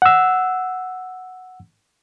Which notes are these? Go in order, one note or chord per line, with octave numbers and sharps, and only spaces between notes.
F#5 E6